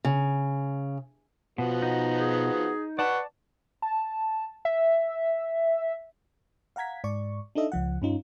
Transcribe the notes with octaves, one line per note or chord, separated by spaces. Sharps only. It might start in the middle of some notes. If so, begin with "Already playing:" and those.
C#3
B2 F3 B3 F#4
D#4
G#4
B4 D5 F#5 A5 C#6
A5
E5
F5 F#5 A#5 G#6 B6
G#2 D5 C#6
D4 D#4 A4 D#5 E5
C#2 F3 F#5
G2 C#4 D#4 F4